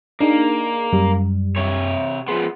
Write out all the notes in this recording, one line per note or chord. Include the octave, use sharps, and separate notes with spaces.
A#3 D4 D#4 G#4
F#2 G3
C3 C#5
F3 B3 G#4 C6